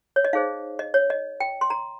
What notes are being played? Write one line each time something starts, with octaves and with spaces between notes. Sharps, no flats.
C#5
D#5
D#4 G#4 C5 F5
D#5
C#5
D#5
G5
C6
A#5